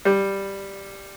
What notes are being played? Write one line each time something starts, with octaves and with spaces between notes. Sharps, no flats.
G3